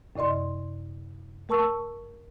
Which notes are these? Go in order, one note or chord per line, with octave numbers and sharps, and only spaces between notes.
F#2 C3 D5 D#5 C6
A3 A#4 A5 C#6 E6